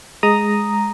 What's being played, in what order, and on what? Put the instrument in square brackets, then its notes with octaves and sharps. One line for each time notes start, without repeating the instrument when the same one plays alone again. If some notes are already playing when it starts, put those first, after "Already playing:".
[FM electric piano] G#3 A#5 D#6